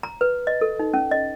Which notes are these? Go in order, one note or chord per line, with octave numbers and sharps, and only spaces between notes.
A#5
B4
D#5
A4
D#4
C#4
D#5